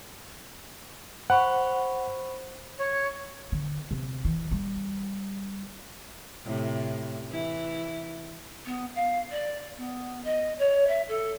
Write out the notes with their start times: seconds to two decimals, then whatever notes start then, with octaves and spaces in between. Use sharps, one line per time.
1.30 C5 F#5 B5 C#6
2.78 C#5
3.52 D3
3.91 C3
4.25 E3
4.51 G3
6.45 A2 C3
7.29 E3 E4
8.65 B3
8.95 F5
9.31 D5
9.77 B3
10.24 D#5
10.58 C#5
10.87 E5
11.08 A4